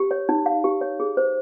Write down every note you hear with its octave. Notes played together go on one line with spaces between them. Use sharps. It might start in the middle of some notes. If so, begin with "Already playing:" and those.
Already playing: G4
C#5
D#4
F5
G4
C#5
G#4
C5